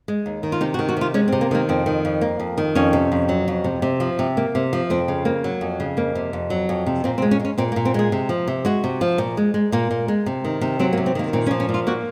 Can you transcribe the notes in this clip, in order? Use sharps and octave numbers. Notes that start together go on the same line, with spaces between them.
G#3
D#2
D#3
F4
C3 D#4
F#4
D#3
F#4
C3 F4
G#3 C#4
C4
C3
A#3
D#3 A#3
F2 C4
D#3
F2
A#3
F2
D#3
F2 C#4
C3
F2
F#3
F2
C3
C3
F3
C3
A#3
C3
F3
F2 C4
C#3
A#3
F#3
F2
C#3
F2 A#3
C3
F2
F#3
F2
C3
A#2 C4
C4
G#3
C#4
G#3
C#4
A#2 C4
A#3
A#2
C4
G#3 G#4
C3
F3
C3
G#3 F#4
C3
F3
A#2
G#3
G#3
A#2 A#3
A#2
G#3
C3
D#3
C3
F#3 C4
A#3
C3
C4
D#3 A#3
A#2 C4
C#4
F3
C#4
A#2
F4
A#3 F#4